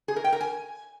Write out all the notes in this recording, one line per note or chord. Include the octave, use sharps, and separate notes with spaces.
G#4
A#4
G5
A#4
G#5